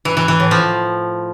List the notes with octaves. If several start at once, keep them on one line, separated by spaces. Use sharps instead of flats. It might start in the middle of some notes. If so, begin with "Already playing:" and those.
E3
E3
E3
A2
F3